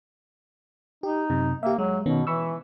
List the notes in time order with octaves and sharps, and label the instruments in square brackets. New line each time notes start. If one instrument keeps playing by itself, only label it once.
[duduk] D#4 [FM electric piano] G4
[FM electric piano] F#2 C3
[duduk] A#3 [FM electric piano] G4 E5
[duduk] F#3 [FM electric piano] G#3
[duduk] B2 [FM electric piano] D#3 B3 C#4
[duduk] E3 [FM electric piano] B5 C#6 E6